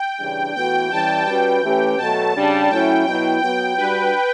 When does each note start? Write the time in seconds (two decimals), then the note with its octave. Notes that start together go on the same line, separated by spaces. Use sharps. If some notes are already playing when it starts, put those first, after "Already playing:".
Already playing: G5
0.19 C#3 E3 G3 D4
0.55 A2 E3 B3 F#4 A4 G5
0.91 E3 G3 C#4 A5
1.27 G3 C#4 F#4 B4 G5
1.62 E3 A3 C#4 G4 B4
1.98 B2 F#3 A3 A5
2.35 C#3 G3 D4
2.70 A2 F#3 C#4 E4 G5
3.06 B2 F#3 B3 E4 G5
3.41 F#3 B3 F#4 G5
3.77 G3 D4 F#4 B4